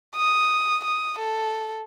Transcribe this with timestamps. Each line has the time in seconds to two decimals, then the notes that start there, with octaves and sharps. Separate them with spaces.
0.16 D#6
0.84 D#6
1.19 A4